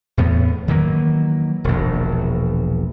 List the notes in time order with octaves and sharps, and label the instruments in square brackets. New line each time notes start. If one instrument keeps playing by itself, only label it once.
[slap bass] E2 A2 B3
D#3 E3 F#3 A#3
E1 A#1